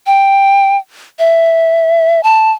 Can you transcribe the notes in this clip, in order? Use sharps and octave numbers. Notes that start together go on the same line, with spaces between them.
G5
E5
A5